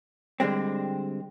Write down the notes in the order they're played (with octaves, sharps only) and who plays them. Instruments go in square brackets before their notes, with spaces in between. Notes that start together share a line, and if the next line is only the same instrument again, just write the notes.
[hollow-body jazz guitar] D3 G3 G#3 C4